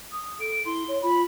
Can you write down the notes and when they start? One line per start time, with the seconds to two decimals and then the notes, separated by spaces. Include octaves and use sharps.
0.12 D#6
0.40 A4 D7
0.65 E4 C6
0.88 C#5
1.03 F4 B5